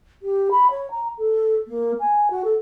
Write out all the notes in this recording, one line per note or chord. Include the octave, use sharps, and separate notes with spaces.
G4
B5
C#5
A#5
A4
A#3
G#5
F#4
A4